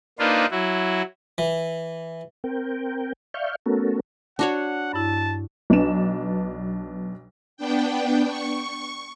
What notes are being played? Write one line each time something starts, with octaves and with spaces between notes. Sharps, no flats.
A#3 D4 D#4 F4 B4 C5
F#3 E4 F#4
E3
C4 A#4 G5
D5 E5 F5 C#6 F6 G6
A3 B3 C#4 F#4 A4 A#4
D4 F#4 C#5 F#5
G2 E4 A5
B1 B3 D4 E7
B3 D4 G5
C#6